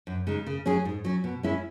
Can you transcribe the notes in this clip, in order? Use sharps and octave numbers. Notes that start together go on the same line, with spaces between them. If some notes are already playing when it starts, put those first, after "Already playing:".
F#2
C#3 G#3 D#4
C#3
F#3 C#4 G#4
G#2
F#3 C#4
B2
G#3 C#4 E4